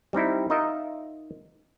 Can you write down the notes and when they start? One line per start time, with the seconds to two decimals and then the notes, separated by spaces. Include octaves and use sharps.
0.13 G3 C4 D#4 E4
0.50 D#4 F4 A#4 D#5 E5